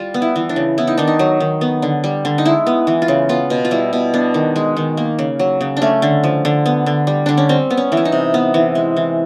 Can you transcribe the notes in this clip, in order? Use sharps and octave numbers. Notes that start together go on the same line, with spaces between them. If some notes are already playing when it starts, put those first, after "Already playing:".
Already playing: G3 F4
B3
E4
E3
D4
C#3
B3 E4
D#4
D#3 D4
D#4
F#3
D#3
B3
D3
G3
D3
D#4
G#3 E4
B3
E3
F4
C#3
B3 F4
B2
F4
G3 E4
B2
B3 D4
D#3
G#3
D#3
A#3
C#3
F#3
C#3
D4
A3 C#4
D3
F3
D3
B3
D3
G3
D3 D4
C#4
G3 C4
B3
C#4
E3
E4
D#4
C3
B3
E3
G#3
E3